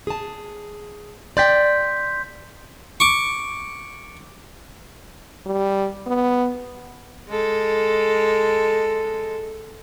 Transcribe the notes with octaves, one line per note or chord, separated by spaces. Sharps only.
G#4 A5
D5 G5 C6 G6 B6
C#6 D6
G3
B3
G#3 A4